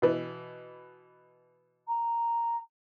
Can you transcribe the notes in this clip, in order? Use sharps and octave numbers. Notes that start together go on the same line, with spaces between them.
B2 E3
A#5